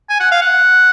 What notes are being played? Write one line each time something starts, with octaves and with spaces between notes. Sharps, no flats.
G#5
F#5
F5
F#5